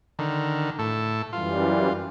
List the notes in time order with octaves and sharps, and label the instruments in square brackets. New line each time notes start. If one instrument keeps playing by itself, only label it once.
[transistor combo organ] D3 D#3
A2 A4
[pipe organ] F#2 E3 G3 [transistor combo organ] F4